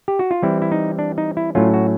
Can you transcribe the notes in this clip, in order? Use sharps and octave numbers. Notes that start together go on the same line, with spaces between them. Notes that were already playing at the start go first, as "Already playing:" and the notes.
G4
F#4
F4
E3 G3 C4 E4
E4
D#4
D4
D#4
E4
A2 F#3 A3 C#4 F4
F#4